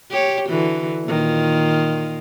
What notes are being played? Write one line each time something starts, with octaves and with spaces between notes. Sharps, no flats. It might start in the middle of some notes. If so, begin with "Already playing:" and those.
G4 C#5
D3 E3 F#4
A#2 D#3 F4